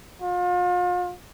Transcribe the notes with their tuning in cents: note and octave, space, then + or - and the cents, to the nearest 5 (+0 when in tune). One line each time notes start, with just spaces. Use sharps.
F4 +40